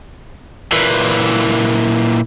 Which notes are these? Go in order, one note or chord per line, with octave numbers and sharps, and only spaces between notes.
A#2 E3